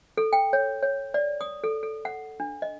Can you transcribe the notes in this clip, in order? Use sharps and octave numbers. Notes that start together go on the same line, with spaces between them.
A4
G5
C#5
C#5
D5
D#6
A4
A4
F#5
D4
D#5